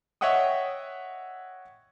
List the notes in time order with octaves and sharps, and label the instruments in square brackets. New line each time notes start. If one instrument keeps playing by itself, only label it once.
[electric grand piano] C#5 D#5 E5 F#5 G5 D#6